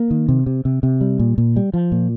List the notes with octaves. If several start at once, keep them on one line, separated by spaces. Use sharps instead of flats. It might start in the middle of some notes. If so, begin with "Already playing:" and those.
Already playing: A#3
D#3
C3
C3
C3
C3
G3
A#2
A#2
G3
F3
A#2